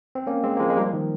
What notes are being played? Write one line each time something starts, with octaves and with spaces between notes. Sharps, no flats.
C4
A#3 C#4
G#3 C4
A#3
F3 G#3
G#3
G3 A#3
F3
D#3